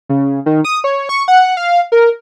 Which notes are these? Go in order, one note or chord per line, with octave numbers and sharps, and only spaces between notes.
C#3
D#3
D#6
C#5
C#6
F#5
F5
A#4